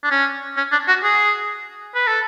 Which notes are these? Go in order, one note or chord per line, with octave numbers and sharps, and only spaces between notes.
D4
C#4
C#4
D4
F#4
G#4
B4
A4